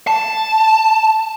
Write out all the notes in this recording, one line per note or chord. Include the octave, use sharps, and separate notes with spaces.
A5